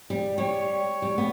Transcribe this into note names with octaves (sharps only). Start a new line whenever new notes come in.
G3
G3 C#5
G3
B3